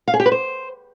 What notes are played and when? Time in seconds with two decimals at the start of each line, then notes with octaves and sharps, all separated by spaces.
0.08 F5
0.14 G#4
0.20 G4
0.26 B4
0.32 C5